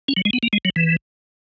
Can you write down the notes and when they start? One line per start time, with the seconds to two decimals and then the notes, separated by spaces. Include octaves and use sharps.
0.08 C#4
0.17 F#3
0.25 G#3
0.33 B3
0.43 A#3
0.53 G#3
0.65 F#3
0.76 E3